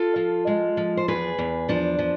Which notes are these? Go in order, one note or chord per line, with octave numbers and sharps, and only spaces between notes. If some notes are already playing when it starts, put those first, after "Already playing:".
Already playing: F4 A4
F3
G#3
F3
C5
E2 G#4 B4
E2
F3 D4
F3